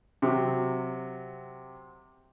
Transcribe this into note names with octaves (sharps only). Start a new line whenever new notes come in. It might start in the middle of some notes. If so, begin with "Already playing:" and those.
C3 F#3